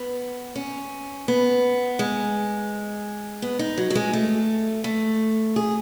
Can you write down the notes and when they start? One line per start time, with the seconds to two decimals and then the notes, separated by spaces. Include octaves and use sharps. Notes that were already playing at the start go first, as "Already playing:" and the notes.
Already playing: B3
0.56 C#4
1.28 B3
1.99 G#3
3.42 B3
3.59 D#4
3.77 F#3
3.90 F#3
3.95 G#3
4.13 A3
4.84 A3
5.56 G#4